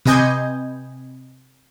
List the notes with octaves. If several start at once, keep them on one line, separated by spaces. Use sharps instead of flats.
C3 B4 D#5 G#5 G6